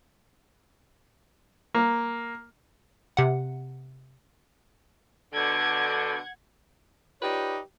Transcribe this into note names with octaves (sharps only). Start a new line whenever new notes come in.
A#3
C3 F#5
B2 D3 F#5 G#6
D#4 F4 G4 B4 C#5 D5